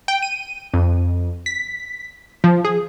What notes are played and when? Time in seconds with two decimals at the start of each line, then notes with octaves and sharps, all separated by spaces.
0.08 G5
0.22 D#7
0.74 F2
1.46 B6
2.44 F3
2.65 G#4